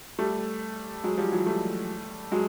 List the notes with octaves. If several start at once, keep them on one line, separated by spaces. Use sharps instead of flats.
G3 A3
F#3 G#3
F3 G3
E3 F#3
G3 A3
F#3 G#3